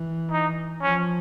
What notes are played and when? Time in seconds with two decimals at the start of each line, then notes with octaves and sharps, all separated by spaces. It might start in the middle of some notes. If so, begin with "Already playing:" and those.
Already playing: E3
0.32 D#4
0.82 F3 C#4